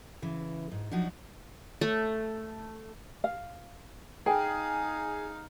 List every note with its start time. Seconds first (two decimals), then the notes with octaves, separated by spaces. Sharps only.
0.22 C#3 E3
0.71 G#2
0.91 F3 F#3 D4 D#4 F#4
1.81 A3
3.24 F5
4.26 D#4 G#4 F5 G5